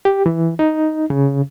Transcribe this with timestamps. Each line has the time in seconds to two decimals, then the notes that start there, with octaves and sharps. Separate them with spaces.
0.05 G4
0.26 E3
0.59 D#4
1.10 C#3